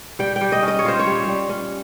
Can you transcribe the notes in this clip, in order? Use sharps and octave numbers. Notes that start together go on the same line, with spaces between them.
G3 G5
G5
G3
D#5
C#4
D#5
C#5
F4 C5
C#5
G3
G3
C#4